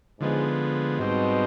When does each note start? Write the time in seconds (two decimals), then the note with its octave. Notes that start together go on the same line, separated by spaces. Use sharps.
0.20 G#2 D3 F3 G#3 B3
0.99 G#2 B2 G3 C4 D#4